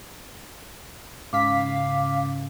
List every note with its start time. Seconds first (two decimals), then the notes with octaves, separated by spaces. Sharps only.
1.33 G#2 C#3 F5 D6 B6